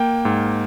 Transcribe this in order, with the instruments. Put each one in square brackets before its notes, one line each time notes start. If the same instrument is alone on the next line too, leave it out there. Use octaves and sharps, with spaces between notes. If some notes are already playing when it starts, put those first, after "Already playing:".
Already playing: [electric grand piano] A#3 G5
G#2